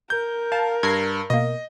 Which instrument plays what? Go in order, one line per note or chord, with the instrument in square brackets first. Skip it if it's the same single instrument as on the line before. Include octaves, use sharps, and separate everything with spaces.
[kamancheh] A#4 [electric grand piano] G6
[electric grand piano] F5 [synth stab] A5
[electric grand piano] G2 [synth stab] G#6 A#6 C7
[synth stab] B2 A#3 [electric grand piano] D#5